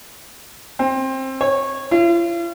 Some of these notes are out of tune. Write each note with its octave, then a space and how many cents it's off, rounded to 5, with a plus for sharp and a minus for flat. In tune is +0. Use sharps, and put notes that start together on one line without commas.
C4 +20
C#5 -20
F4 -45